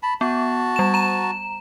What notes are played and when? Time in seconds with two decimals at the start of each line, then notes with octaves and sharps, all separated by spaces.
0.03 A5 B5
0.21 B3 F#4 A5
0.76 G3 E7
0.94 A#5 E7